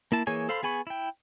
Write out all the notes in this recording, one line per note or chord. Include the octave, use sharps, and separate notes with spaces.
A#3 E4 A5
E3 A#3 G#4 C#5 G#5
A4 C5 F5 B5 C6
B3 G#4 G#5 B5 C#6
E4 G5